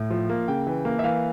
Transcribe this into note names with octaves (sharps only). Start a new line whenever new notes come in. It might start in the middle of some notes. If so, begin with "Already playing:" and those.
Already playing: A2
F3
A#3
C#3 G5
E3
A#3
E5
E3 F5